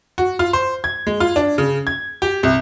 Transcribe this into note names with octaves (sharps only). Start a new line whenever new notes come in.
F#4
F4
C5
G#6
G#3
F4
D4
C#3
G#6
G4
C2